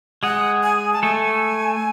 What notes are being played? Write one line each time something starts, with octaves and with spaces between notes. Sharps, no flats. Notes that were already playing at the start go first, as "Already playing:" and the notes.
G#3 G#4 F#5
G#5
A5
A3 A4 G#5